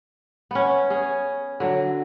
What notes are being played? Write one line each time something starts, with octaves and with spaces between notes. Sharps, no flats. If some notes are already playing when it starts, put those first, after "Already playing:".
B3 C#4
C#4 G#4
D3 F#3